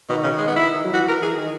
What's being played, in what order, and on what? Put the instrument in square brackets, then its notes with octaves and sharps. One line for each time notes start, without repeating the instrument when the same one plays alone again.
[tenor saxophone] B2 [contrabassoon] D#3
[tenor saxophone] C#3
G#3
B3
E4
[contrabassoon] D#3
F#3
[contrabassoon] E3 [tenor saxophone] F#4
[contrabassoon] E3 [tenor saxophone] A#4
[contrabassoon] E3 [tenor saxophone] G#4
[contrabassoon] D#3